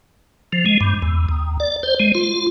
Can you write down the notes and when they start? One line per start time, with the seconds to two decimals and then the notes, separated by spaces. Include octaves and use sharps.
0.53 F3
0.66 G#3
0.81 G2
1.02 E2
1.29 D#2
1.60 D5
1.83 C5
2.00 G#3
2.15 F4